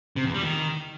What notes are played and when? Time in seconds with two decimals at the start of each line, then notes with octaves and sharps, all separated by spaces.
0.16 C3
0.25 E2
0.34 G3
0.43 D#3